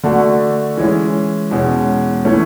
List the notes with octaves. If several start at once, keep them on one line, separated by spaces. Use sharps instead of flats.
D3 A3 D4 F#4
E3 G#3 C#4
E2 B2 G#3 C#4
E3 A3 C#4